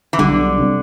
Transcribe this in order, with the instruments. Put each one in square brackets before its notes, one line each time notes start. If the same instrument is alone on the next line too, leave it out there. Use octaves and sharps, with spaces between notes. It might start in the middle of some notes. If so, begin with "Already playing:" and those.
[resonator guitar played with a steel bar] E3
[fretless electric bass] B1 B2 G3 D4 [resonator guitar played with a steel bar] D3
[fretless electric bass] C3 E3 G3